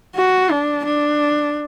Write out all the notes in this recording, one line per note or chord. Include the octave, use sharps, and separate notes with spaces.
F#4
D4
D4